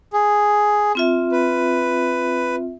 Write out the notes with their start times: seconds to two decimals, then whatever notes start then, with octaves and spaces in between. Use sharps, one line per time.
0.13 G#4
0.95 C4 F4 E5
1.32 B4